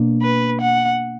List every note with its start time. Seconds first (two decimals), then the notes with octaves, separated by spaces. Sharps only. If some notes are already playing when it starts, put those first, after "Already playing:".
Already playing: B2 A#3 D4
0.22 B4
0.61 F#5